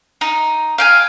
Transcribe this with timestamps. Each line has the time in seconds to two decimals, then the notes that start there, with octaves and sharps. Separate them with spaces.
0.21 D#4
0.78 F5 G5 G#5